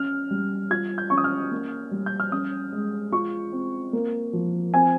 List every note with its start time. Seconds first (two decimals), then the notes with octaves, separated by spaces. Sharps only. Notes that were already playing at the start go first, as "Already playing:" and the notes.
Already playing: C#4 F6
0.31 G3
0.70 F4 G#6
0.98 G6
1.10 C#4 C#6
1.18 D#6
1.24 F6
1.51 A#3
1.91 G3
2.06 G6
2.20 F6
2.32 C#4 D#6
2.73 G#3
3.12 F4 C#6
3.52 C4
3.93 A#3
4.33 F3
4.74 C4 G#5